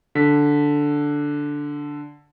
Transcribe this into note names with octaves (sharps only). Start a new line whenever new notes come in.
D3 B6